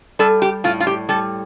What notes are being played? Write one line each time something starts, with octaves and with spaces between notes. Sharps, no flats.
G3 A4
G4
A2 F4
F4
G4
G3 A4